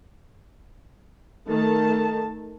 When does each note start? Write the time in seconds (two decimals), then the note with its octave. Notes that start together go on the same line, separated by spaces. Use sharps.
1.49 D#3 A3 A5